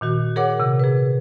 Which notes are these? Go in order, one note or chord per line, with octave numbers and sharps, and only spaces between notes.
A#2 D#3 F#4
G#4 A#4 C#5 F#5 D6
C3
G#4 B4